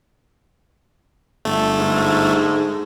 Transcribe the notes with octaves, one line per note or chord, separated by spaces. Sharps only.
G1 A3
G#2